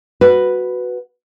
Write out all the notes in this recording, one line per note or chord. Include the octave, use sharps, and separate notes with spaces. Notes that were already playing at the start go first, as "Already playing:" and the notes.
F#4 B4